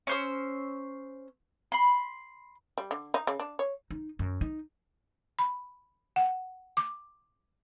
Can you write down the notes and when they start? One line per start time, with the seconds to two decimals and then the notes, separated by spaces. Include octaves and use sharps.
0.07 C#4 C5 E6
1.72 B5 C6
2.78 G3
2.91 D3
3.14 D#4
3.27 C#3
3.40 D4
3.59 C#5
3.91 D#4
4.19 F#2
4.41 D#4
5.39 B5
6.16 F#5
6.77 D6